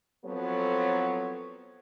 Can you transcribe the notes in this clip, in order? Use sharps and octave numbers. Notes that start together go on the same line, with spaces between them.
F3 F#3 B3 C4 A4 C#5